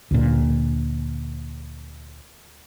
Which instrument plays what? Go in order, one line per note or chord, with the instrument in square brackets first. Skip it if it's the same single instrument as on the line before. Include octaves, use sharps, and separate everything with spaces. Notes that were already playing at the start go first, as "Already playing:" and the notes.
[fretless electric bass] D2 A#2